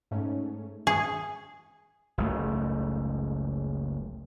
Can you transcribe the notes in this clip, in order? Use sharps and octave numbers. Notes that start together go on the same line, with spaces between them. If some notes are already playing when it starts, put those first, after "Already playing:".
G#2 A3 C#4
G#4 G#5
F#1 C#2 A3